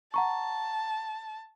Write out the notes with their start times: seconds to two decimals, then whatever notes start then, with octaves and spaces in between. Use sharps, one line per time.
0.14 F#5 A5 A#5 C#6